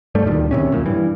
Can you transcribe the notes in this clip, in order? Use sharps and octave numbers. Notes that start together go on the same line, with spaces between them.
G2 G3 A3
D2 G2 A#2 D#3
D1 D#2 C3 C#4
G#1 F#2 A#2
G2 E3